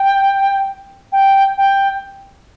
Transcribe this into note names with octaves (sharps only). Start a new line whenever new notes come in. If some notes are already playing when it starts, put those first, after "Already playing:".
Already playing: G5
G5
G5